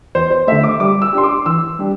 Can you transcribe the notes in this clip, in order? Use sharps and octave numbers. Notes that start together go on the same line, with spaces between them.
E2 C5
C5
D3 A3 E5
D6
G3 D6
E6
D4 G4 C6
D6
E3 E6
G3 D4 G4